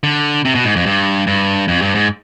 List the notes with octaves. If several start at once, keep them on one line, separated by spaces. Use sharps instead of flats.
D3
C3
B2
G#2
F2
G2
G2
F2
G2
G#2